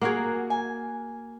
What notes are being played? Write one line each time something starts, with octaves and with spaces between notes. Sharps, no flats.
A#3 F#4 G#4 A#4 F#5
G#5